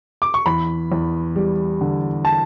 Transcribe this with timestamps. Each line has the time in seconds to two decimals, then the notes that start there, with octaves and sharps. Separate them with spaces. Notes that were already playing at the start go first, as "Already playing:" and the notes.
0.22 D6
0.34 C#6
0.46 E2 B5
0.92 E2
1.36 G3
1.81 D3
2.25 A5